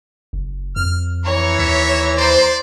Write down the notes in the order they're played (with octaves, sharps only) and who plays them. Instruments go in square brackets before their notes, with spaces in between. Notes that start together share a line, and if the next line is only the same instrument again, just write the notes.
[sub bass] F#1
[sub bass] F2 [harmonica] F6
[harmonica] E3 A#5 [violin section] C#5
[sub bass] D#2 [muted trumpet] E5
[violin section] C5 [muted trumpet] D5